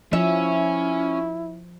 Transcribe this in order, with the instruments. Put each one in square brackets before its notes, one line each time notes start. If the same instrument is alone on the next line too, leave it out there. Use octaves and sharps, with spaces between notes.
[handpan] F3 [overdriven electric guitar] C#4 [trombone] E4 [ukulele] E5